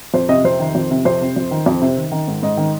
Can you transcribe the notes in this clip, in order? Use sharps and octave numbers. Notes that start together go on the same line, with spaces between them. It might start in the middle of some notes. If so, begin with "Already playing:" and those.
F2 C5
C3 D#5
F2 C5
D#3
F2
C3
F2 C5
C3
F2
D#3
F2
C3
D#3
D#3
G#2
G#2 D#5
D#3